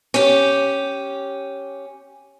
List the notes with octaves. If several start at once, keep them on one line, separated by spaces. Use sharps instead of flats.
C#4 G4